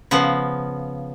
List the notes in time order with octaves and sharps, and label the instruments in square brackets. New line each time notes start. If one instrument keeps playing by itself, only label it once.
[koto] C#3 F3 B3